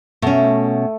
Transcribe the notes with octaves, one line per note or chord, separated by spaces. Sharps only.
B2 A3 C#4